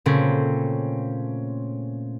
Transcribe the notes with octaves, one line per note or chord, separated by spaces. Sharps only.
A#2 C#3 A3 C4 C#4